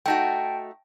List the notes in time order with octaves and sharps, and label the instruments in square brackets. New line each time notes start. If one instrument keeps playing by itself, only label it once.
[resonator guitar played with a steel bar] A3 D#4 F#4 [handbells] G5 A5